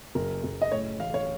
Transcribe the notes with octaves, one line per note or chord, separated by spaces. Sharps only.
F#1 A#4
F#1
D#5
A2 C#5
A1 F5
C#5